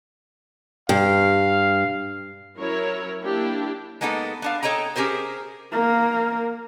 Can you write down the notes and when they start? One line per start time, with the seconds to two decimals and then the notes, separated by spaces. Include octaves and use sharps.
0.89 G2 F5
2.57 F#3 C#4 E4 A#4 C#5
3.22 A#3 D4 E4 G4
4.01 G#3 A#3 B3 D#4 F#4 A4
4.42 B3 D4 F5
4.63 A4 C#5 D#5 G5 A#5
4.96 C#4 G4 G#4 A#4 C5
5.72 A#3 A#4